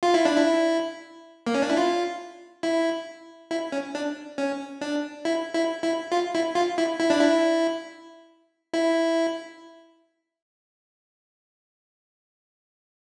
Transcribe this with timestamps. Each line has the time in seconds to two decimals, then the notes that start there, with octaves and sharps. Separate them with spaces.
0.03 F4
0.14 E4
0.25 D4
0.36 E4
1.47 A#3
1.55 C#4
1.62 D4
1.70 E4
1.77 F4
2.63 E4
3.51 E4
3.72 C#4
3.95 D4
4.38 C#4
4.81 D4
5.25 E4
5.54 E4
5.83 E4
6.12 F4
6.35 E4
6.55 F4
6.78 E4
7.00 E4
7.10 D4
7.21 E4
8.74 E4